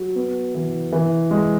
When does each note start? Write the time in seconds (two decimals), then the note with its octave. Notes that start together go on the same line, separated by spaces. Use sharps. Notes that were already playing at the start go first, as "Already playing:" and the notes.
Already playing: F#3
0.15 B3
0.55 E3
0.92 E3
1.31 G#3